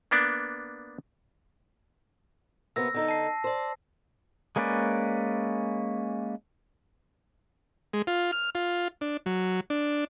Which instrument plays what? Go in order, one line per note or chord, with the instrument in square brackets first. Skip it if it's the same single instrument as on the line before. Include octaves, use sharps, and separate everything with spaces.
[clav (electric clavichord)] A#3 B3 D4
[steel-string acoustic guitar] C3 A#3 B3 [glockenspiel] E6 A#6
[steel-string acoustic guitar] D3 D#4 A4
[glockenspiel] A5 C7
[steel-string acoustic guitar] C5 D5
[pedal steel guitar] G#3 A#3 C#4 B4 D5
[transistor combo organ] G#3
F4
F6
F4
D4
F#3
D4